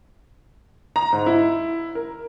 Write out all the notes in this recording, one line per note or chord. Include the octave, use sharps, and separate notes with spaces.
A#5
G#2
E4
A#4